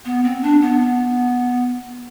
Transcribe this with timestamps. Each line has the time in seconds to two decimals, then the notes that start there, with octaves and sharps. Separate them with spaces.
0.05 B3
0.24 C4
0.43 D4
0.61 B3